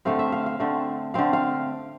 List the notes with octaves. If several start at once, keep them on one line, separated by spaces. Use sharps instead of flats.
D3 A3 C4 F5
E5
F5
F5
D3 A3 C4
D3 A3 C4 F5
F5